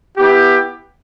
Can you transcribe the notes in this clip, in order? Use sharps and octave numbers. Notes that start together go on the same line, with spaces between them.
B3 E4 G4